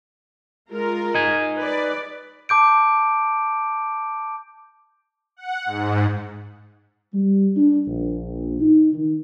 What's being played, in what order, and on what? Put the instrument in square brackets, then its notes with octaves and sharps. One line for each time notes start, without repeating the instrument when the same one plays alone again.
[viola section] G#3 F4 A#4
[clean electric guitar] D#4 G#5
[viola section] B4 D5
[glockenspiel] A5 D6 G6 D7
[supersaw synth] F#5
G#2
[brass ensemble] G3
D4
A#1
D#4
D#3